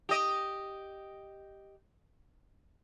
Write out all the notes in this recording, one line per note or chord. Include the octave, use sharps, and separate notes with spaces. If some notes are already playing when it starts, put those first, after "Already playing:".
G4 D#5